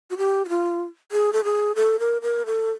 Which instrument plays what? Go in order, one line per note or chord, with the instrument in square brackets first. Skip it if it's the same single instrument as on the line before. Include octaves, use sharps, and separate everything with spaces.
[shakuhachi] F#4
G4
F#4
F4
G#4
A4
G#4
A4
A#4
A#4
A4